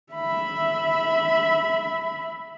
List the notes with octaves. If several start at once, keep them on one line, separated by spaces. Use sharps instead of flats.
E5 B5